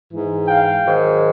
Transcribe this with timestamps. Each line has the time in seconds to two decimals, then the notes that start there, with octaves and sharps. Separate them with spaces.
0.11 G#2 E3
0.47 F5 G5
0.83 G#2 D#3 F#3